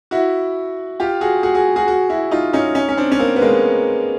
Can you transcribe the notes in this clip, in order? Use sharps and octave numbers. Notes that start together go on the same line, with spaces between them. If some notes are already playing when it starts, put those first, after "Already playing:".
E4 F#4
F4 G4
F#4 G#4
F#4 G#4
F#4 G#4
F#4 G#4
F#4 G#4
E4 F#4
D#4 F4
C#4 D#4
C#4 D#4
C#4
C4 D4
C#4
A#3 C4
B3
G#3 A#3